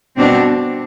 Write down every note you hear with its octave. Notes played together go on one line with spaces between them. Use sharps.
B2 G3 C4 D4